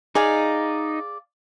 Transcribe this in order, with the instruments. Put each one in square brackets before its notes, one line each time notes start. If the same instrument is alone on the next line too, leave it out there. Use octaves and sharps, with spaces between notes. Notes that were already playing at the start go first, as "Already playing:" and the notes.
[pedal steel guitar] D#4 [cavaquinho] G#4 D5 F5